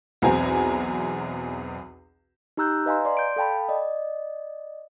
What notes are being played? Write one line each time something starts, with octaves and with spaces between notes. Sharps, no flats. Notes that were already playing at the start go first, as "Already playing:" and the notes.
B1 E2 C4 G#5 A#5
D#4 G4 A#5 E6 F#6 G6
B4 D#5 F5 G#5 A#5 C6
D5 C6
G6 D7
A4 F5 G5 A5 B5
D5 D#5